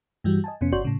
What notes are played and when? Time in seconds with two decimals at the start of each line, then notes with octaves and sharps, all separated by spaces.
0.24 G2 E3 G3 F#4
0.44 D#5 G#5 A5
0.61 F2 C3 B3 C#4
0.73 G1 F#4 C#5 D5 C6 G6
0.85 A2 C#3